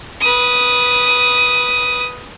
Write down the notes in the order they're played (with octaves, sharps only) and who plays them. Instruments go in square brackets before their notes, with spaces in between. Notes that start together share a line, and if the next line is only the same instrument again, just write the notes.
[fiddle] B4 D#6